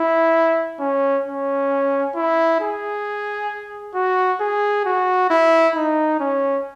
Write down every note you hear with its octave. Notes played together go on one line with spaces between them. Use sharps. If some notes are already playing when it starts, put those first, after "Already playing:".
Already playing: E4
C#4
C#4
E4
G#4
F#4
G#4
F#4
E4
D#4
C#4